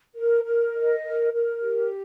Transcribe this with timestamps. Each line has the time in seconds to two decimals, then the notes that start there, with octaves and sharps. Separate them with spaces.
0.14 A#4
0.44 A#4
0.74 D#5
1.03 A#4
1.33 A#4
1.63 G4